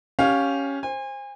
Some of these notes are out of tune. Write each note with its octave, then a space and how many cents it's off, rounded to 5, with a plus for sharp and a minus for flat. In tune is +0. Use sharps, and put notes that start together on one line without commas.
C#4 +0 G4 +0 F5 +15
C5 +15 G#5 -35